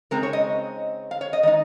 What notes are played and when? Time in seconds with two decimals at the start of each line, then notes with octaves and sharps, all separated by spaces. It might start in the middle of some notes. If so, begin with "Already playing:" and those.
0.11 C#3 G#3 C4 D#4 A#4
0.23 C#5
0.33 D#5
1.11 F5
1.21 C#5
1.33 D#5
1.43 D#3 G#3 D#4 D#5